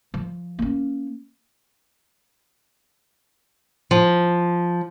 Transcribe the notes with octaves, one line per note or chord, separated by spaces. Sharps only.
F3
A#3 C#4
F3